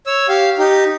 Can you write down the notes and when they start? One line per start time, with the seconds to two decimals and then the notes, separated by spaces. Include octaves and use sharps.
0.07 C#5 E6
0.29 G4 F5
0.59 D#4 G4